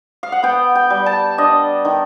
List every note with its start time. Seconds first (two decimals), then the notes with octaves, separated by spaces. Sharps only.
0.23 F5
0.32 F#5
0.43 B3 G5
0.75 G5
0.90 G3
1.06 A5
1.38 D4 D#5
1.85 D#3